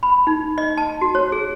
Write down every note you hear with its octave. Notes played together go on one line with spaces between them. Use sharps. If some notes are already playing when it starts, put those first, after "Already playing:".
B5
D#4
D#5
A5
F#4
C#5
G#4